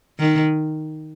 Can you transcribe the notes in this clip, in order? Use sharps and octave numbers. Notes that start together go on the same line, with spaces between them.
D#3